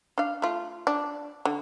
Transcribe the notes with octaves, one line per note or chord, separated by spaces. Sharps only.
D4 F5
A3 F4
D4
D3